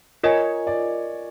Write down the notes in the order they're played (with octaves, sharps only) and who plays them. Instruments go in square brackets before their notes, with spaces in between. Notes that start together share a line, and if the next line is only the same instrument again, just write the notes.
[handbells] F4 A#4 D#5 G#5 [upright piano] C#5
[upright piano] D5